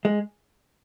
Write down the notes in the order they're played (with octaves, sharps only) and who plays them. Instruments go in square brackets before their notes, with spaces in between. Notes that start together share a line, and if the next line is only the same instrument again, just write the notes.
[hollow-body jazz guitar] G#3